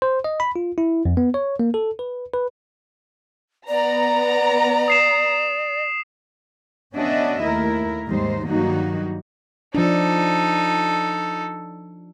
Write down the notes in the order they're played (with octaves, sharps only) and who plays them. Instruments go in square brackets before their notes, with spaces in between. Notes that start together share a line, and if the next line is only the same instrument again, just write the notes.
[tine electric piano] C5
D#5
B5
F4
E4
F2
B3
C#5
A#3
A4
B4
B4
[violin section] B3 A#5 [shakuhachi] D5
[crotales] D#6 C7 E7
[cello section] B3 C#4 D4 F#4 D#5 E5
D#2 A3 E4 A#4
D#2 G#2 G3 D#4 C5
G2 D#3 F#3 A#3 D#4 F#4
[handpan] F3 D4 [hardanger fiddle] D#4 A4